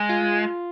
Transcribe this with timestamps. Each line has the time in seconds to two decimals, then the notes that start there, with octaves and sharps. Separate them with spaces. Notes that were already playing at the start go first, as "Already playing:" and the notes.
Already playing: G#3
0.09 F4